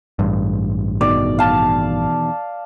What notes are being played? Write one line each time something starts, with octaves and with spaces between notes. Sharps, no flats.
A1 G2
E2 B2 D#3 D5
F5 A5